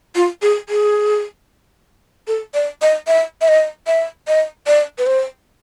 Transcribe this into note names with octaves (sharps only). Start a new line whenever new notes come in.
F4
G#4
G#4
A4
D5
D#5
E5
E5
D#5
E5
D#5
D5
B4
C5